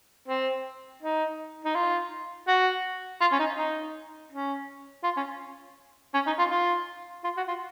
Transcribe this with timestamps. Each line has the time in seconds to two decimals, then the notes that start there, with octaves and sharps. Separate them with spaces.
0.28 C4
1.02 D#4
1.65 D#4
1.75 F4
2.47 F#4
3.21 F4
3.32 C#4
3.39 D#4
3.57 D#4
4.31 C#4
5.04 F4
5.17 C#4
6.14 C#4
6.27 D#4
6.39 F4
6.51 F4
7.24 F4
7.37 F#4
7.48 F4